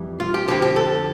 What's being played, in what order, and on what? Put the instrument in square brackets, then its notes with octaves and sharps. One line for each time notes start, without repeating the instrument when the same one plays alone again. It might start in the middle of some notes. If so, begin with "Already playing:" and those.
Already playing: [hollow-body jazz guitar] F2 E3 G3
F4
G4
F2 D3 F3 C4 G4
G4
A4